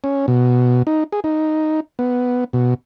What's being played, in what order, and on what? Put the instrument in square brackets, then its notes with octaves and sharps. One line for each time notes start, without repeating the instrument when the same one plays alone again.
[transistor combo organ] C#4
B2
D#4
G#4
D#4
B3
B2